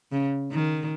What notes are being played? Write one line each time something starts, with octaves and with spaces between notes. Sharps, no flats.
C#3
D#3